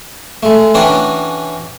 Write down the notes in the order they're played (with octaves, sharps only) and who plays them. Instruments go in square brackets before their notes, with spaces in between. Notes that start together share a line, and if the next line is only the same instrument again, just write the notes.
[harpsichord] G#3 A3
E3 C#4 D4 F#4 G5